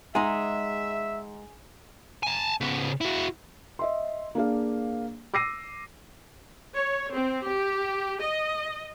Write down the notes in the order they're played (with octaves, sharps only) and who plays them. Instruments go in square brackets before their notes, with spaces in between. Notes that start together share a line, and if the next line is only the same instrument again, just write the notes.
[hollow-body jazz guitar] G#3 D#4 [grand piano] G#4 [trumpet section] E5 [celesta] F#5 A#5 C6
[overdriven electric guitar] G#5 A5
C#3 B3
E4 F#4
[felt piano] D#5 E5 C6
A#3 D4 G#4 F5
D6 E6 A#6 C7 D#7
[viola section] C#5
C4
G4
D#5